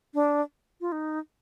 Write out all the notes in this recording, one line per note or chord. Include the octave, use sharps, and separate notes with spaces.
D4
F4
D#4